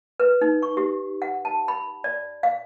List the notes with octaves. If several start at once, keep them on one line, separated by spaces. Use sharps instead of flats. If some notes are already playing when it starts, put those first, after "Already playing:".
B4
D#4
C#6
G4
F#5
A5
B5
D5
F5